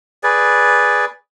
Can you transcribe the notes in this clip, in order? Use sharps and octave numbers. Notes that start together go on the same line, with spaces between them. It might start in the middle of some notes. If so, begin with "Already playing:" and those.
G#4 B4 D5